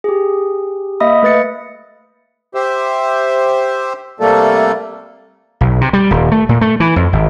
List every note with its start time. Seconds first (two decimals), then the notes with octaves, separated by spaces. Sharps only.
0.04 G4 G#4
1.00 A#3 D#5 E5 B5 D#6
1.23 A3 B4 A6 C#7
2.55 G4 C5 E5
4.20 C3 G3 A3 A#3 A4
5.61 B1
5.81 C3
5.93 G3
6.11 D#1
6.32 A3
6.49 A#2
6.61 A3
6.80 E3
6.96 F2
7.13 G#1